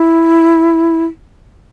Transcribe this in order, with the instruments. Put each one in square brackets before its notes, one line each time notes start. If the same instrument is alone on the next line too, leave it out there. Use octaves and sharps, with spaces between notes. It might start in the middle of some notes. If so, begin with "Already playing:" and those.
Already playing: [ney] E4